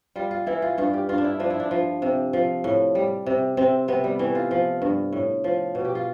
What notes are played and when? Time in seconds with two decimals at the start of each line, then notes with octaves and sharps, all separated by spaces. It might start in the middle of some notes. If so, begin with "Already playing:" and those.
0.16 G3 F4
0.31 F4
0.47 E3 E4
0.62 F4
0.78 G2 F4
0.94 G4
1.09 G2 F4
1.18 D4
1.24 E4
1.40 F3 D4
1.50 E4
1.60 D4
1.71 F3
2.02 C3
2.33 F3
2.64 A2
2.95 G3
3.26 C3
3.57 C3 C4
3.88 C3 B3
4.04 G3
4.19 E3 A3
4.35 F4
4.51 F3
4.82 G2
5.13 A2
5.44 F3
5.75 B2
5.85 G4
5.95 F4